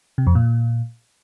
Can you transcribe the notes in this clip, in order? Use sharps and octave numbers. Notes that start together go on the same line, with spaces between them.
C3
F2
A#2